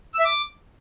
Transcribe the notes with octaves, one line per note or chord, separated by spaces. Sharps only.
E6
E5
D6